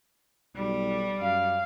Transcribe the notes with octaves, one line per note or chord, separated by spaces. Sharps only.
B1 G3
F#2 F5